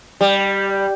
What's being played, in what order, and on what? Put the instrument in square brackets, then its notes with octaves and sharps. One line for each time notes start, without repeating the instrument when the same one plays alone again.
[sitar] G3